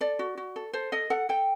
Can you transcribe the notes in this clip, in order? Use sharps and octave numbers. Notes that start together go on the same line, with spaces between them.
A4 D5
F#4
F#4
A4
A4 C5
A4 D#5
A4 F#5
A4 G5